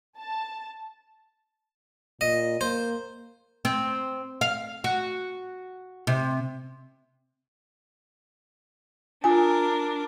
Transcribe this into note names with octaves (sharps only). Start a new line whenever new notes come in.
A5
A#2 D#5
A#3 C5
C4
F5
F#4
C3
D4 F4 A#4 G#5